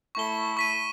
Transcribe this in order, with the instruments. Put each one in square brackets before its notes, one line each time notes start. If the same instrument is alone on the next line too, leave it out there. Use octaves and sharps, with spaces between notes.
[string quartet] A3 E4 A4 [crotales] C#6 G7
[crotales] C#6 B6 D#7